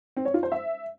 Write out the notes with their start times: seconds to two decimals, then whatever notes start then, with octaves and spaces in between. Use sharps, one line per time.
0.17 C4
0.25 C#5
0.34 F4
0.43 C5
0.52 E5